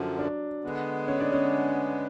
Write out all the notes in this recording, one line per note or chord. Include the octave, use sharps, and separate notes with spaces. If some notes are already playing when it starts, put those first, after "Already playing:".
Already playing: F#2 D3 F3 F#3
D4
D3 G#3 B3
C#4
D4
C#4